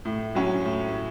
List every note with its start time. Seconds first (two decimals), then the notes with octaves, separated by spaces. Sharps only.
0.05 A2
0.35 F#3 C#4
0.65 A2